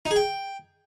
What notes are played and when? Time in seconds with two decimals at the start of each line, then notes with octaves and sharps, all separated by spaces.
0.06 D#4
0.11 G#4
0.16 G5